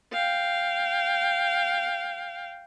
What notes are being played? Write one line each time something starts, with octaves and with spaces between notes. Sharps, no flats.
F5 G5